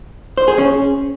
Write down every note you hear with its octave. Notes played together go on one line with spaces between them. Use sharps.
C5
G#4
C#4